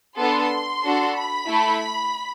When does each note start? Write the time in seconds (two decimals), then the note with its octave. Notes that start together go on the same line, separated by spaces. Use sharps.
0.18 B3 D4 A4 C6
0.83 D4 F#4 A4
1.15 B5
1.48 A3 E4 A4